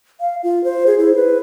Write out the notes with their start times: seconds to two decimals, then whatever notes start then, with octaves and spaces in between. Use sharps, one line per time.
0.20 F5
0.43 F4
0.64 C5
0.87 G#4
0.99 E4
1.16 B4